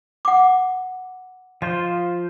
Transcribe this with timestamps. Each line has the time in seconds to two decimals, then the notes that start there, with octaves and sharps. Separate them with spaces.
0.25 F#5 D6
1.62 F3 F4 C5 D#5